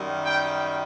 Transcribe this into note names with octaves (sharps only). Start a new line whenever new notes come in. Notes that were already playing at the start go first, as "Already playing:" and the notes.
Already playing: F#2 D#3 G3
G5